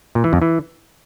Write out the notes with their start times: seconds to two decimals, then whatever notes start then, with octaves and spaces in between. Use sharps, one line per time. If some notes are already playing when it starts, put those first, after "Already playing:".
0.15 A#2
0.24 E3
0.33 F2
0.42 E3